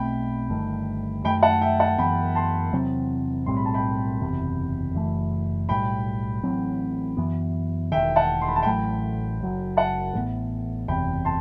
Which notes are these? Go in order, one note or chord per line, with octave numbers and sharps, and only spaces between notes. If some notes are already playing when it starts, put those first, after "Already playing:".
Already playing: B1 B2 A3 C4 G5 B5
G1 G2 D#3 A3
F#2 D#3 A3 G5 B5
F#5 A5
E5 G5
F#5 A5
F#2 E3 B3 G5 B5
A5 C6
E2 C3 F#3 C4
B1 A2 G3 C4 C6
B5
A5
G5 B5
F#1 E2 C3
F#1 F#2 E3 A3
B1 A2 G3 G5 B5
A1 A2 F#3 C4
F#2 E3 B3
E1 E2 D#3 E5 G5
F#5 A5
C6
B5
A5
A1 A2 F#3 A3 G5 B5
F#1 F#2 F#3
F#5 A5
A1 A2 F#3 B3
F#1 E2 C3 G5 B5
A5 C6